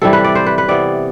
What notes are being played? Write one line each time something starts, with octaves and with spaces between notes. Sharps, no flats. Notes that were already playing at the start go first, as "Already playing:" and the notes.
C3 E3 G3 A4
B4
D5
C5
B4
B4
C3 E3 B3 D5